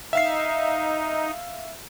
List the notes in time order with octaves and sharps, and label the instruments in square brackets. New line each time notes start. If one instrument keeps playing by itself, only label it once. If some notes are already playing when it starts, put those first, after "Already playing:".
[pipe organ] D#4 [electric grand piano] E5 F5 C7